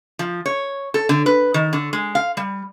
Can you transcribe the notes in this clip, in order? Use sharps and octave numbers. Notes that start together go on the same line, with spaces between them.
F3
C#5
A4
D3
B4
D#3
D3
G#3
F5
G3